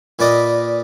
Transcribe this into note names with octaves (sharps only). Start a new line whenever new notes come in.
A#2 B4 D5 D#5